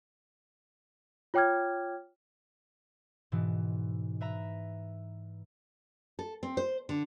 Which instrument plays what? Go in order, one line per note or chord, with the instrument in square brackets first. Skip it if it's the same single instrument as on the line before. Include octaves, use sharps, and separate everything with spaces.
[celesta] F4 C#5 G5 D6 F6 G#6
[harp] G#2 B2 E3
B4 E5 A#5
[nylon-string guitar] A4
C4
C5
D3